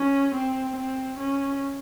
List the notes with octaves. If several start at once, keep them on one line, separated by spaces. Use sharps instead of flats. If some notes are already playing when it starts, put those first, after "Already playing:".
Already playing: C#4
C4
C4
C#4